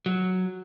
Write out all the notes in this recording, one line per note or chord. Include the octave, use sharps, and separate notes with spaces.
F#3